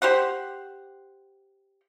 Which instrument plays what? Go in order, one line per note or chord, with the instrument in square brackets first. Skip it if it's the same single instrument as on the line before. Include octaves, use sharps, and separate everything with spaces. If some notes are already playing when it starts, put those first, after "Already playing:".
[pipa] G4 C5 F#5